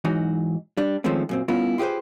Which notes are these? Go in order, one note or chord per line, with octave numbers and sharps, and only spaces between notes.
G#2 E3 F#3 D#4 F#4
G3 D4
D#3 F3 G#3 A3 C4 C#4
F#2 A#2 C4
G3 B3 C#4 E4 F4 A#4
F4 G4 G#4 B4 C5